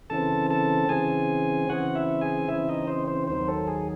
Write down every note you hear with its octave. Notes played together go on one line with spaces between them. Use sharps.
C#3 E3 C4 A4 A5
A4 A5
C#3 E3 C4 G#4 G#5
C#3 E3 C4 F#4 F#5
E4 E5
G#4 G#5
C#3 E3 C4 E4 E5
D#4 D#5
C4 C5
C4 C5
D#2 D#3 F#3 C4 C5
A4
G#4